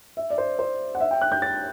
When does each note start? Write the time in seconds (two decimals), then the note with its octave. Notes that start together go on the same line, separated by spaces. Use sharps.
0.17 E5
0.30 D5
0.38 C5
0.59 C5
0.95 F#5
1.01 E5
1.11 G5
1.21 F#6
1.32 G6
1.42 A6